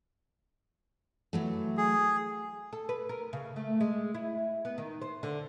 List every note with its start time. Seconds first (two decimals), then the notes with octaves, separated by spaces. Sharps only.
1.33 E3 F#3 A3
1.78 G#4
2.73 A4
2.89 B4
3.09 A#4
3.33 C#3
3.56 A3
3.81 G#3
4.15 E4
4.65 B3
4.78 D#3
5.01 C5
5.23 D3